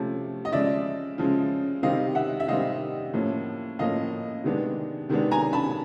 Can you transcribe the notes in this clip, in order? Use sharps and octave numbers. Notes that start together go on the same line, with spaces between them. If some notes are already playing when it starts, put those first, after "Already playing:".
Already playing: C3 F3 A3 C#4
D#5
C#3 F3 G#3 D5 E5
C#3 F3 G#3
C3 D#3 G3 C4 D#5 F5
E5 F#5
E5
C3 D#3 G3 C4 D#5 F5
A2 F3 A#3 C#4
A2 F3 A#3 C#4 D#5 F5
C3 D#3 G#3 B3 D4
C3 D#3 G#3 B3 D4
G#5 A#5
A5 B5